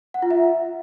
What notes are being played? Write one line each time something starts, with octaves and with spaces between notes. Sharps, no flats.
F#5
F4
E5